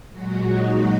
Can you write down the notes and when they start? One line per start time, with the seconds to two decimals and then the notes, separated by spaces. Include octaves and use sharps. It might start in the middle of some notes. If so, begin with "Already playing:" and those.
0.12 A#2 F#3 G#3 F#4
0.47 D#4